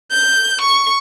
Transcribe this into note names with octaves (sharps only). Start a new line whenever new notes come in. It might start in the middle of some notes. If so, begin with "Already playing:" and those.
G6
C#6